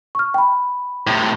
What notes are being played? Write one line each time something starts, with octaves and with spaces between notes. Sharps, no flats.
C#6 F6
G5 B5
A2 C3